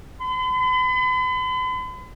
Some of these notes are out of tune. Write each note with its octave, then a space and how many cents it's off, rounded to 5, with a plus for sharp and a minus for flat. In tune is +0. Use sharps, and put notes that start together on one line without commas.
B5 +45